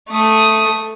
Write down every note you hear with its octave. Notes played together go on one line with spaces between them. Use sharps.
A3 D#6